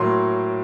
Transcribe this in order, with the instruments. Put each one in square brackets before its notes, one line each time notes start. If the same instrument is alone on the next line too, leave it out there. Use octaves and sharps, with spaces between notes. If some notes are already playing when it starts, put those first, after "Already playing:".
Already playing: [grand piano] A2 F#3 A#3 C6